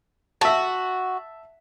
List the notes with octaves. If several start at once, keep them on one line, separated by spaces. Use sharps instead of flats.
F#4 E5 A5